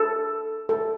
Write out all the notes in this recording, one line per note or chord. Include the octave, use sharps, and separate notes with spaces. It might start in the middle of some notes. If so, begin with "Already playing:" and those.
Already playing: A4
A4